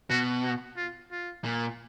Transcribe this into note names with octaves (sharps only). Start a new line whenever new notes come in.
B2 F#4
F#4
F4
F4
A#2